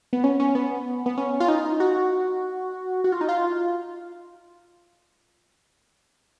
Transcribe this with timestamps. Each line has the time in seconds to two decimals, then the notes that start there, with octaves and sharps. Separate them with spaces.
0.13 B3
0.24 C#4
0.40 C#4
0.55 B3
1.06 B3
1.18 C#4
1.40 F4
1.48 D#4
1.80 F#4
3.04 F#4
3.12 F4
3.21 D#4
3.29 F4